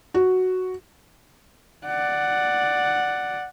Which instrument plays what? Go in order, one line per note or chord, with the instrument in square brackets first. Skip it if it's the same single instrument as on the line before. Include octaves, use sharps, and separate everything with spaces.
[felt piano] F#4
[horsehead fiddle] D5 F#5